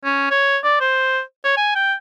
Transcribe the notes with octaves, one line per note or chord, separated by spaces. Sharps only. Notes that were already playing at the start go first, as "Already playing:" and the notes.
C#4
C#5
D5
C5
C#5
G#5
G5